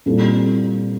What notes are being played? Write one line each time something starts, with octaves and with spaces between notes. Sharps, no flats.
A#2 G3 C4 E4 A4